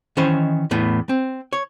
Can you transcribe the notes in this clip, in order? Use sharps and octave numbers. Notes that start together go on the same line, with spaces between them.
D#3 E3 C#4 C5 C#5 D#5
E2 A2 B3
C4
C#5